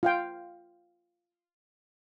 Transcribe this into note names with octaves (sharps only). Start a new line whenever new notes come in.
F4 F5 G5